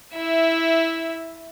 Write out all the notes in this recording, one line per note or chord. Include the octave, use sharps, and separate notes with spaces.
E4 E5